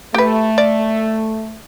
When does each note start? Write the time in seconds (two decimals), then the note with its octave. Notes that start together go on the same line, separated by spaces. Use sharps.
0.14 A3 G4 B4
0.58 D5